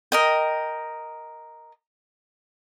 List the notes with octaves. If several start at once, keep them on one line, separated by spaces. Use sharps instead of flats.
A#4 D#5 G5